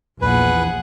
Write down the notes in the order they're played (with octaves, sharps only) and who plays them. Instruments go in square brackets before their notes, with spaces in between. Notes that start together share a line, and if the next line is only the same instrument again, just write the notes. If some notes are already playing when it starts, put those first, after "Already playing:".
[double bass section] A#1 [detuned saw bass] E2 [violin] G#4 F#5 [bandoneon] B4